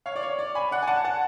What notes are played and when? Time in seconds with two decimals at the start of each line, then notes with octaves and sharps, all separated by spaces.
0.06 C#5 F5
0.16 D5
0.23 C#5
0.39 D5
0.55 G#5 B5
0.71 D5 F#5
0.82 G#5
0.87 F#5 A5
1.05 F#5 A5